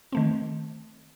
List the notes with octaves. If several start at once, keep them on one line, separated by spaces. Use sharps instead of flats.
D#3 A3 C4